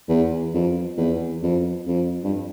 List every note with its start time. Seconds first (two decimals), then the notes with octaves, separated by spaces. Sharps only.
0.09 E2
0.54 F2
0.98 E2
1.43 F2
1.87 F2
2.24 G2